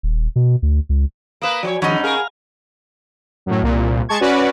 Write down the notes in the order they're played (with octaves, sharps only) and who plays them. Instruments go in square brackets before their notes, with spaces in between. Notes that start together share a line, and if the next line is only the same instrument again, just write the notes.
[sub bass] D#1
B2
D2
C#2
[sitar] A#3 B4 [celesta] F5 D#6 E7
[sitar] F3 B4 C#5 [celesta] F#4 [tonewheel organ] D5 G#5
[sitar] G2 [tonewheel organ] D#3 F3 [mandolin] C#4 D#4 [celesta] F#5 B5
[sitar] G#4 A#4 [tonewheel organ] F5 A#5 F6
[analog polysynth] F#2 A2
C2 A#2
G#3 A5 C#6 G#6
C#4 F#4 B4 D5